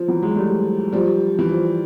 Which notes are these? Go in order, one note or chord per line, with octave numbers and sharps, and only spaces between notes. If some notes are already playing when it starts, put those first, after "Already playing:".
Already playing: F3
E3 F#3
F#3 G#3
G3 A3
F3 G3
E3
F3